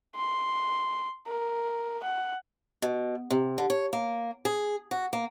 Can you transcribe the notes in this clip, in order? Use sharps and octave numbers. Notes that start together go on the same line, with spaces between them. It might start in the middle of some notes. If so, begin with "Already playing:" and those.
C6
A#4
F#5
B2
C3
D3
C#5
A#3
G#4
F#4
A#3